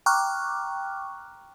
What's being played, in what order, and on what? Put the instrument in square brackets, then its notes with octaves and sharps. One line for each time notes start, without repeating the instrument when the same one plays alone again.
[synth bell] G5 A#5 C#6 D6 F6 F#6